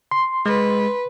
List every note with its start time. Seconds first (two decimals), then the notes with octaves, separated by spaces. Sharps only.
0.11 C6
0.46 G#3 B4